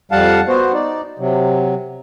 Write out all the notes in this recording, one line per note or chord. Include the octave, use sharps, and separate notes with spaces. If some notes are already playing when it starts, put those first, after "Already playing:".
F2 G3 F5 F#5 A5
B3 F#4 C5
D#4 D5
C3 F#3